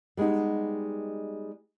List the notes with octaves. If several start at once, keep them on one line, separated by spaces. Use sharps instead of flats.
G3 G#3 B3 D#4